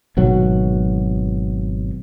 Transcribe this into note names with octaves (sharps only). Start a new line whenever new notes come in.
G#1 B2 F#3